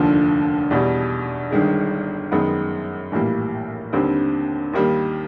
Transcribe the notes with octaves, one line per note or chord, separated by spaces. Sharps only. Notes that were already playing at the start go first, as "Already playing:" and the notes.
Already playing: F1 D#2 D3 F3
E2 B2 G3
G1 G2 D#3 G#3
F#2 D#3 G#3 B3
A#1 A2 E3 G3 A#3
D#2 D3 G3 C4
D#2 D#3 G3 A#3